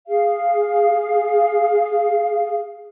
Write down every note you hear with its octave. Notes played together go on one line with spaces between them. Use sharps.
G#4 F5